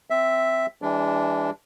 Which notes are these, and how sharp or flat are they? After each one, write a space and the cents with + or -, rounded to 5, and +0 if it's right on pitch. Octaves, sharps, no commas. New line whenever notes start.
C4 -5 E5 +0
E3 +0 G#3 -45 D4 -10